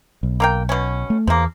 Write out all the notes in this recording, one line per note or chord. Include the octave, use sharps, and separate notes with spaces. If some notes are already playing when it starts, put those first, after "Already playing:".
B1
A#3 A#4 G5
B2 C#4
A3
E2 F3 A#3